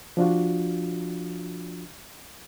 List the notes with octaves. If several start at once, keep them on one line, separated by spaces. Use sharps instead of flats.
F3 D4 F4 F#4